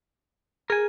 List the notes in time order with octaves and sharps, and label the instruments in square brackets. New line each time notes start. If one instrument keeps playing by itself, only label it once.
[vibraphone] G#4 [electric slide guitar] A#4 G#5